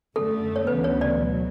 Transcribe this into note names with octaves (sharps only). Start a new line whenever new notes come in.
F#2 D3 A3 A4
C#5
D2 C#3 E3 B3 B4
C#5
D5
B2 F#3